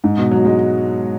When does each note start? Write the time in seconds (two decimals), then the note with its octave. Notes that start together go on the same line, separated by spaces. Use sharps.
0.04 G#2
0.18 B2
0.31 F#3
0.45 G#3